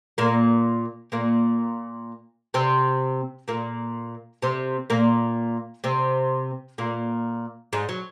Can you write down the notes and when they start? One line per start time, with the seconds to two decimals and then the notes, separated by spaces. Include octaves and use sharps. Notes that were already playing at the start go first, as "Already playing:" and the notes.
0.18 A#2 A#3
1.12 A#2 A#3
2.54 C3 C4
3.48 A#2 A#3
4.42 C3 C4
4.90 A#2 A#3
5.84 C3 C4
6.78 A#2 A#3
7.73 G#2 G#3
7.89 F#3